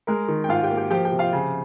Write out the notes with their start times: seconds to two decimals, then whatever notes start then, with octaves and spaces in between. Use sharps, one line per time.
0.07 G#3 A#4
0.28 D#3
0.44 G5
0.49 G#2 F4 F5
0.63 G4 G5
0.71 A#3
0.77 G4 G5
0.91 F3 G4 G5
1.05 G4 G5
1.12 C3
1.19 F4 F5
1.33 C#3